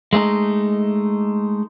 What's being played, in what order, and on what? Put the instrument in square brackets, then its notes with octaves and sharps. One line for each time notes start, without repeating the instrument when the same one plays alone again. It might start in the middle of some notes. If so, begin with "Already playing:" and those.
[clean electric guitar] G#3 A3 C#4 D#4